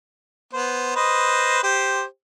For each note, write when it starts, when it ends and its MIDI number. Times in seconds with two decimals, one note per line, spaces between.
0.53 0.92 59
0.53 0.92 72
0.96 1.59 71
0.96 1.59 72
0.96 1.59 75
1.63 2.04 67
1.63 2.04 72